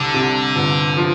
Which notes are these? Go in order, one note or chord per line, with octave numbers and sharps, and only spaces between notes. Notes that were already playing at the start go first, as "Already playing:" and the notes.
Already playing: C2 D3
C3
G1
F3